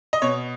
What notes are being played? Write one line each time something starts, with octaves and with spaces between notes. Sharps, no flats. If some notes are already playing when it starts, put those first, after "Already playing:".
D#5
B2 C#5